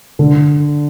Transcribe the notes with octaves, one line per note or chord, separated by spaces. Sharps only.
D3